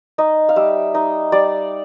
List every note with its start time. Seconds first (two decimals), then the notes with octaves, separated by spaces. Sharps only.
0.18 D#4 D#5
0.49 F5
0.56 G3 E5
0.94 D#4 D#5
1.32 G3 D5